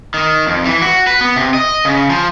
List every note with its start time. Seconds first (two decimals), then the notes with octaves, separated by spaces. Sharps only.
0.14 D#3
0.47 F2
0.65 E3
0.82 F#4
1.07 B4
1.21 B3
1.36 C3
1.54 D#5
1.85 C#3
2.10 F3